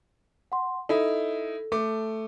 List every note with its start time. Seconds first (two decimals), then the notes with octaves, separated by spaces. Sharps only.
0.52 F#5 C6
0.89 D#4 E4 A4
1.72 A3 D6